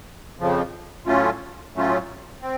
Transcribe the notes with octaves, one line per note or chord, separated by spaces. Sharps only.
F2 C#3 F3
A2 F#3 A3 C#4 F4
A2 F#3 A3 C#4 F4
C4